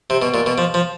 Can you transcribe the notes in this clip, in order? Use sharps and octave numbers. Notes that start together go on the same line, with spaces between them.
C3
B2
A#2
B2
F3
F3